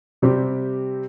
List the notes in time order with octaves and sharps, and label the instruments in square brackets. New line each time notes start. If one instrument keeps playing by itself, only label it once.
[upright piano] C3 G3 C4 G4